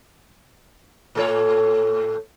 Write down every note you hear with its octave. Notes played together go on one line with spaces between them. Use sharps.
A2 A4 C#5